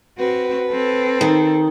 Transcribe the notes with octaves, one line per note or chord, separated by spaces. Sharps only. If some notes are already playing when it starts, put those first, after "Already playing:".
C4 F#4 B4
C4 A4
D#3